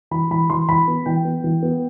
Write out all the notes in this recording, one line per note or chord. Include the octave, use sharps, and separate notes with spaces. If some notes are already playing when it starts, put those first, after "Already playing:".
E3 B5
E3 B5
E3 C6
E3 B5
B3
E3 G5
B3
E3
B3